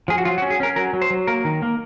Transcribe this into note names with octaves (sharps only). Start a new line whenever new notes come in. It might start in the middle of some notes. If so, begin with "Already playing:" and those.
F3 G#4
F#4
F#3 F4
F#4
C#4
G#4
C#4 A#4
F#3 A#4
F#3
C5
F#3
A#3 A#4
D#3
A#3